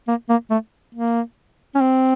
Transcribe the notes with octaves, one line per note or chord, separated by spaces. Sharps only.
A#3
A#3
A3
A#3
C#4
C4